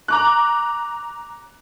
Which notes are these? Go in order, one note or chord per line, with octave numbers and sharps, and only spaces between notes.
A#5 D6 F#6